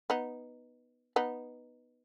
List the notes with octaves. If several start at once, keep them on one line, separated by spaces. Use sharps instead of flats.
B3 D#4
B3 D#4